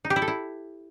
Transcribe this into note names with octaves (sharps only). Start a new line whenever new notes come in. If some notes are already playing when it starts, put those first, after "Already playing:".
D#4
G4
E4
A4
E4